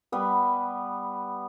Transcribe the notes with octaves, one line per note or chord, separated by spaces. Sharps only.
G3 B3 B4